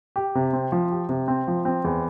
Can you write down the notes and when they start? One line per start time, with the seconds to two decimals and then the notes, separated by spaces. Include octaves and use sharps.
0.16 G4
0.35 C3
0.53 C4
0.72 F3
0.91 G4
1.09 C3
1.28 C4
1.48 F3
1.65 C4
1.84 E2